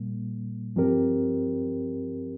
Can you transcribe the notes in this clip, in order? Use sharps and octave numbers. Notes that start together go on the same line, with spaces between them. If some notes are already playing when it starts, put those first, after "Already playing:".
Already playing: A#2 G3 A#3
G2 F3 C4 G4 A#4